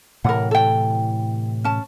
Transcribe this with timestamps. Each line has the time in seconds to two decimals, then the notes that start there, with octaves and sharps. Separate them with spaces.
0.24 A2 C3 E3 A#4 F#5
0.51 A4 G5
1.64 C#4 A5